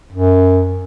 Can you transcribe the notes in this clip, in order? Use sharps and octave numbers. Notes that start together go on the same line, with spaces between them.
F#2